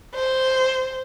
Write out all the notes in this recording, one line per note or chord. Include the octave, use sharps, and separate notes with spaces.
C5